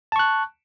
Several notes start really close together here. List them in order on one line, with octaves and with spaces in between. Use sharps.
A5 C#6 F#6